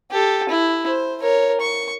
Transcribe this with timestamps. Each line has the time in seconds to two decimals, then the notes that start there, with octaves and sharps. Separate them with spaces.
0.11 G4 A4
0.49 E4
0.88 C5
1.21 A#4 C#5
1.61 C#6